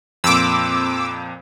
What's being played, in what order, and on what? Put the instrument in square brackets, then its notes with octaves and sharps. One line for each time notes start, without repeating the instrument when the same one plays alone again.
[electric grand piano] F2 A#2 [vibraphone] C4 [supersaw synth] D6 E6